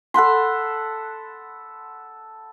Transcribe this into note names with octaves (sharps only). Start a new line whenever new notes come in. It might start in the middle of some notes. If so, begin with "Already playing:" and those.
A4 F#5 B5 C6